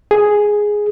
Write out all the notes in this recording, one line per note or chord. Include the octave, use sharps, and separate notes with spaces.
G#4